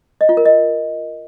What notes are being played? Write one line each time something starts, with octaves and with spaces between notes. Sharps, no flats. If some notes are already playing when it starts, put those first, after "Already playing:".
D#5
F4
A#4
D#5